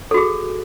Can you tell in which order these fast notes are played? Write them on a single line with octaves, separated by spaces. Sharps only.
A4 F#4 G#4